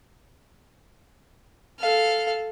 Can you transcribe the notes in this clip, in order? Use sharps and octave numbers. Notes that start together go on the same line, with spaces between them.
A4 F5